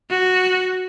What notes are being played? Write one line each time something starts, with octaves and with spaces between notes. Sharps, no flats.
F#4